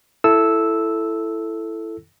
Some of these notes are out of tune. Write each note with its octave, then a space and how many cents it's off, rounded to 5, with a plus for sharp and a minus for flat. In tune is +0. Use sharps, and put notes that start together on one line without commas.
E4 +10 A4 +0 E6 -5